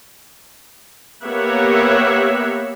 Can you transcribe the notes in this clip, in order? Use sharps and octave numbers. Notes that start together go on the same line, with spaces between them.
A#3 B3 G4 C#5 E5 F#5